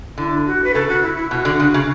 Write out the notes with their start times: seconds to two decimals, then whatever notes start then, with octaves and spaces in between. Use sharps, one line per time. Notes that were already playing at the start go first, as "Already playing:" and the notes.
0.18 D3 E4
0.46 F#4
0.64 B4
0.74 C#3 A4
0.89 F#4
1.02 E4
1.16 E4
1.31 B2 F#4
1.45 D3
1.60 C#3
1.74 C#3